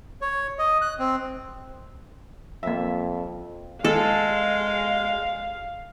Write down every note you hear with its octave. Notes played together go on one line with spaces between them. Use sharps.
C#5
D#5
F#6
C4
F2 A#3 E5
G#3 A4 F5